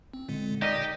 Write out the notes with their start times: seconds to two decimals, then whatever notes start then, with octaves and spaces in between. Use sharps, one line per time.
0.14 C4
0.29 A#2 D3 G#3
0.62 D#4 G4 A#4 D5 D#5